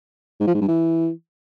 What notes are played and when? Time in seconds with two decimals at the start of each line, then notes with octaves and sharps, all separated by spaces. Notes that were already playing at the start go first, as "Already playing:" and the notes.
0.40 G#2
0.47 F3
0.54 G#2
0.61 G2
0.68 E3